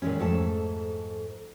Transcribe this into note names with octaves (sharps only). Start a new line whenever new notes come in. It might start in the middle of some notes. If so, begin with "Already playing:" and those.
A#2 D#3 E3 G#3 C#4
F2 G#2 A3 A4 A5